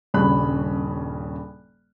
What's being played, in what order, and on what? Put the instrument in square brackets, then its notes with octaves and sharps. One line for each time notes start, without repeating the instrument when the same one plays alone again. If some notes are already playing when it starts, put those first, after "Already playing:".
[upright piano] D#1 G2 C#3 C#4 B5 F#6